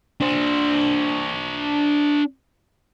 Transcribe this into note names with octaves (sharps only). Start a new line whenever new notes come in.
D4 C5